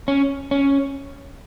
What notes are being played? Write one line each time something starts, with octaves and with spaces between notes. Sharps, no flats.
C#4
C#4